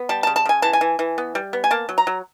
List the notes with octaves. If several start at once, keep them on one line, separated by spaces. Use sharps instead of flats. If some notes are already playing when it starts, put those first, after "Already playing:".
Already playing: B3
G3 A5
A5
C#3
A5
C#3 G#5
E3 A5
G#5
E3
E3
B3
G3
B3
G#5
A#3 A5
F#3
A#5
F#3